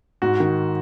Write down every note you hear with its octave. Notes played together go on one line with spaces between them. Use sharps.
G#2 F#4
D#3